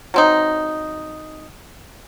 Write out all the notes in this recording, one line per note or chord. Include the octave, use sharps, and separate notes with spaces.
F#3 C4 D#4